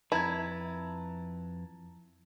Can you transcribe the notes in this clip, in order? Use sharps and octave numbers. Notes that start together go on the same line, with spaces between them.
F2 E4 B4 A5 A#5 G#6